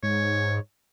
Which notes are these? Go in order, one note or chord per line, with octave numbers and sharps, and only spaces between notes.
G#2 C#5